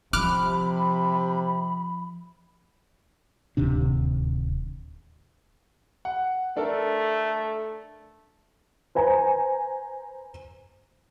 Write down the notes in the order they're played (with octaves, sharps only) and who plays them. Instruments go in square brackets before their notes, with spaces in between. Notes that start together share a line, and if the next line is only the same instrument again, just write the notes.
[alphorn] C3 [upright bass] F3 [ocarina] B5 [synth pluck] D6 F6 F#6
[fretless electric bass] D1 D#2 C3 D4
[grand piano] F#5
[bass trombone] A3 [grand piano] D4 A4 A#4
[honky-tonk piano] B4 C5 G#5 A#5